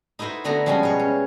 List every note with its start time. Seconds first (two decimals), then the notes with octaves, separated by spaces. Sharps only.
0.19 D#4 E4 F#4 B4 C5
0.44 D3 A3 B3 F#4 A#5
0.66 F3 G3 G#3 C#4 F#4
0.83 B2 C#5
0.99 C#4